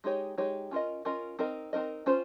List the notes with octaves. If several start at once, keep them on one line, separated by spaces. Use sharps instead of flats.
G#3 D#4 G4 C#5
G#3 D#4 G4 C#5
C#4 F4 A#4 D#5
C#4 F4 A#4 D#5
C4 D#4 A#4 D#5
C4 D#4 A#4 D#5
C#4 F4 C5